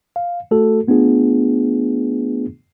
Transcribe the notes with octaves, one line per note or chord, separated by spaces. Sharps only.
F5
A3 F#4 A4
A3 B3 D4 F4 G#4